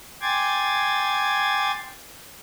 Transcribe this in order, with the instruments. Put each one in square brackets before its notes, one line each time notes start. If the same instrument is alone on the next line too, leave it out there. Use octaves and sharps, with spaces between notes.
[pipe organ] G5 G#5 C6 D6 G#6 A6